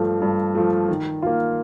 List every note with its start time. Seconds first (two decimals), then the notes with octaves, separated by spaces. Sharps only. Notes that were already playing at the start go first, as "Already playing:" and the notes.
Already playing: G2 F3 A3
0.22 G2
0.55 F3 A3
0.89 D#3
1.22 A#3 F4